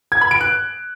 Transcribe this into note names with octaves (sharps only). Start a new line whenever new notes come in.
G#6
B5
D7
F#6